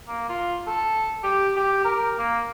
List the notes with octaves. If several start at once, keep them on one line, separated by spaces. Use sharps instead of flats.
A#3
F4
A4
G4
G4
A#4
A#3